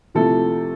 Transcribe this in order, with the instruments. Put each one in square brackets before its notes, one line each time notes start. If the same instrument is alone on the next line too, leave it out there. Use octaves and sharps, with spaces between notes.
[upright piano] C3 F3 A3 E4 A4